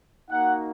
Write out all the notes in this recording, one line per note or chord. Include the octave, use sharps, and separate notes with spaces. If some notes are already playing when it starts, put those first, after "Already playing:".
A#3 D#4 F#4 F#5